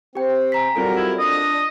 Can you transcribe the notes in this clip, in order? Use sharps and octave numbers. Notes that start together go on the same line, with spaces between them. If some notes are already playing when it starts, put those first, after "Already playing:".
C4 G4 G5
G#5 A#5 B6
F#3 G3 C4 F4 A4 A#4
E4
D4 D#5